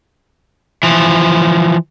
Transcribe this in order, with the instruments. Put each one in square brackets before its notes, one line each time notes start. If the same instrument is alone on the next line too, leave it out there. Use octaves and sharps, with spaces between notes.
[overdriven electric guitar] E3 F3